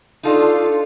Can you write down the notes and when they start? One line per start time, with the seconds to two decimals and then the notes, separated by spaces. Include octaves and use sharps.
0.23 D4 D#4 F4 A4